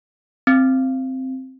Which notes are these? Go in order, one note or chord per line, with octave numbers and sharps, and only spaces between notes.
C4